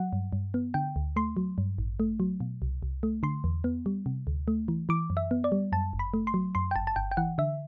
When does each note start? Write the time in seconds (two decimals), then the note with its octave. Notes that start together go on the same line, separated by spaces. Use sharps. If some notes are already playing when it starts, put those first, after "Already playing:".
Already playing: F#3 F#5
0.13 G2
0.33 G2
0.54 B3
0.74 D3 G5
0.96 D2
1.16 A3 C6
1.37 F#3
1.58 G2
1.78 A1
2.00 A3
2.20 F#3
2.40 B2
2.62 C2
2.83 C2
3.03 A3
3.23 D3 C6
3.44 E2
3.64 B3
3.86 G3
4.06 C3
4.27 D2
4.48 A3
4.68 E3
4.89 E3 D6
5.10 F#2
5.17 E5
5.31 B3
5.44 D5
5.52 G3
5.72 F#2 A5
5.93 G1
5.99 B5
6.14 A3
6.27 C6
6.34 F#3
6.55 F#2 C6
6.71 G5
6.76 G1 A5
6.87 A5
6.96 G1 G5
7.11 G5
7.17 E3 F#5
7.38 D3 E5